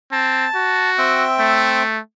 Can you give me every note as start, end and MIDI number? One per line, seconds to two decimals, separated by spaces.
0.12 0.46 60
0.12 0.90 81
0.55 1.25 66
0.98 1.83 60
0.98 1.83 76
0.98 1.83 79
1.40 1.99 57